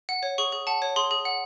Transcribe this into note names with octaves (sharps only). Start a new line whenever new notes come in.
F#5
C#5
G#4 C#6
G#4
F#5 A5
C#5
G#4 C6
G#4
F#5